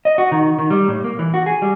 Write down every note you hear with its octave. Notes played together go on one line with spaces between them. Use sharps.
D#5
F#4
D#3
D#3
G3
A2
A#3
E3
F#4
G#4
G3